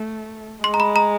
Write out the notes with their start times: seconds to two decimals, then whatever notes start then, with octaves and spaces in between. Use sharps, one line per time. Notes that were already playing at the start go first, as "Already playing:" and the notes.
Already playing: A3
0.63 G#3 C6
0.74 A#5
0.80 B5
0.96 A#5